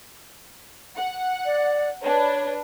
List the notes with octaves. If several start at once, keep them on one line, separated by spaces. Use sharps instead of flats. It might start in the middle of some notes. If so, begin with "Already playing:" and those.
F#5
D5
D4 B4 C#5